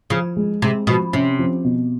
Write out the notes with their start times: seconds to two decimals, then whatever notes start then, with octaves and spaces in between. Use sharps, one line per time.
0.10 C#3 F3
0.37 G#3
0.62 C3 G#3
0.87 B2 F3
1.13 C3 C#4
1.39 F3
1.64 B2